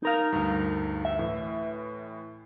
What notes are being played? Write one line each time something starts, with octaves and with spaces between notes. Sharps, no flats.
D#4 A#4 F5
D2 G2
E5
A2 E3